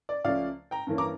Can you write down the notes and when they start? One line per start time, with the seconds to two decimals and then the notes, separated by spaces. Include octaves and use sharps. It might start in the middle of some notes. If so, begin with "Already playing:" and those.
0.09 D5
0.24 C#2 C#3 F3 A3 C#4 D5 F5
0.71 G5 A#5
0.87 G2 E3 A#3 C#4
0.98 A#5 D6